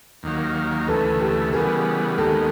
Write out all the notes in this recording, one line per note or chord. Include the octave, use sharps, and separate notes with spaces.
D#2 D#3 F#3 A#3
D2 C#3 E3 A3 A4 B4
G4 A4
C#3 E3 G3 B3 G#4 A#4
D#2 D#3 G#3 B3 G4 A4